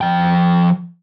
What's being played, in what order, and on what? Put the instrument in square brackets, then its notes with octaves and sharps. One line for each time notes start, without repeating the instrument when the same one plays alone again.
[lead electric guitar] F3 G5